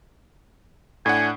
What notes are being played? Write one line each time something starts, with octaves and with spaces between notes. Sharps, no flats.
A2 D4 F#5 G#5